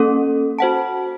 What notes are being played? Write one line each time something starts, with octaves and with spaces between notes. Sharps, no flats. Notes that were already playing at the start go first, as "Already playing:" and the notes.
Already playing: A#3 C#4 A4
F#4 C5 F#5 A5